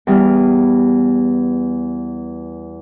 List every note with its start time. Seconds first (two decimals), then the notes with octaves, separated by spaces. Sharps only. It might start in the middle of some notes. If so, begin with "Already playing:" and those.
0.07 E2 G3 B3 F6